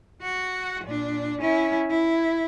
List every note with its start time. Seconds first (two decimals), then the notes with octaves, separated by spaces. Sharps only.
0.22 F#4 F#5
0.85 A#2 D4
1.40 C#4 E4
1.90 E4